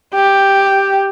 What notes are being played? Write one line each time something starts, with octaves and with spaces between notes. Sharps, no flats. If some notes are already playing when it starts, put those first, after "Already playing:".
G4